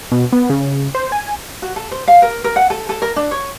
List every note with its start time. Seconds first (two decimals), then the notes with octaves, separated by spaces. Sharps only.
0.12 B2
0.33 B3
0.50 C#3
0.95 C5
1.12 G#5
1.62 F#4
1.76 A4
1.92 C5
2.08 F5
2.22 A#4
2.44 A#4
2.56 F#5
2.70 A4
2.89 A4
3.02 A#4
3.16 D4
3.31 C#5